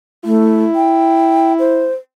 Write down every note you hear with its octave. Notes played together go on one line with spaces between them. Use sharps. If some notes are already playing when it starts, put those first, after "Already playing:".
A3 E4
G5
C5